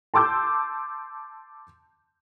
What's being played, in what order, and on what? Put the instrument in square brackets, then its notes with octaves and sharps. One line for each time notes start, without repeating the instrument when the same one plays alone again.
[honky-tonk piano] A5 C6 D6 E6 G6